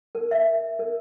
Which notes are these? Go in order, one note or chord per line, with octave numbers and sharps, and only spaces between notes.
A#4
E5
A#4